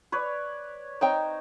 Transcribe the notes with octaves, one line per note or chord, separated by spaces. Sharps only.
B4 C#5 D5
C4 D#4 C#5 G5